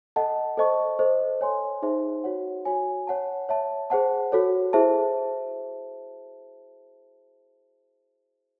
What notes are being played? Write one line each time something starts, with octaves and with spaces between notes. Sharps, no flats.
A4 D#5 F#5 A5
A4 C5 D#5 A5 C#6
A4 C5 D#5
C#5 G#5 C6
D#4 G#4 C5 E5 C6
F#4 C#5 F#5
F#4 C#5 G#5
C#5 F#5 A5
C#5 E5 A5
G#4 C5 F#5 A5
F#4 A4 C#5
E4 G#4 C5 E5 A5